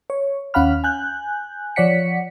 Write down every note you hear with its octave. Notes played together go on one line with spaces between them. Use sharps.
C#5
D#2 C#4 F5 F#5 B5 F6
G#5 F#6 G6
F3 C#5 D5 F#5 B6 C#7